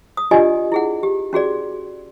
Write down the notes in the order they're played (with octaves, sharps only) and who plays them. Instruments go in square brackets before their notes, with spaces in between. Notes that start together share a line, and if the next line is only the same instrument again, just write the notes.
[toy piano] D#6
D4 F4 G4 D5 D#5 G#5
E4 G#4 F#5
G4
C#4 F#4 G#4 D5